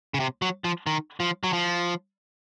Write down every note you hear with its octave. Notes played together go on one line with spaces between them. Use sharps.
C#3
C3
F#3
F3
D#3
F3
F#3
F3